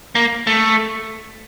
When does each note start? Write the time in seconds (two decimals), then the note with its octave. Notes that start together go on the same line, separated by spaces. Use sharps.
0.15 A#3
0.47 A3